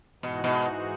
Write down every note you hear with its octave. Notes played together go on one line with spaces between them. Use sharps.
G#2 B2 E3 G#3 D#4 F#4
B2